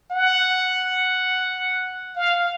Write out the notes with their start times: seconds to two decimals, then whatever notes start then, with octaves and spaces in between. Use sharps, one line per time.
0.11 F#5
2.16 F5